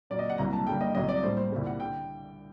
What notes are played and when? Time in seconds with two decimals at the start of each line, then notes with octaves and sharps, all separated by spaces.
0.10 A#2 F#3 A#3 D5
0.19 D#5
0.30 F#5
0.38 C2 C3 F#3 A#3 A#5
0.53 A5
0.67 G2 D3 G3 A#3 G5
0.81 D#5
0.95 C2 C3 F#3 A3 D#5
1.09 D5
1.23 A2 G3 A#3 C5
1.37 C5
1.52 C2 A#2 G3
1.66 F#5
1.80 D3 G5